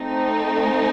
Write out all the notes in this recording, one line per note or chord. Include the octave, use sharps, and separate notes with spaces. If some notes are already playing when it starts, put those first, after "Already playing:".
Already playing: A3 C4 D#4